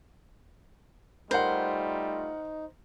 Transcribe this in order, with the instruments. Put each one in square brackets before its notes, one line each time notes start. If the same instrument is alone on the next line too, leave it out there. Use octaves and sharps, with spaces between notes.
[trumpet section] G3 A3 F4 [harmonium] D#4 [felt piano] A#4 F#5 [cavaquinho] C5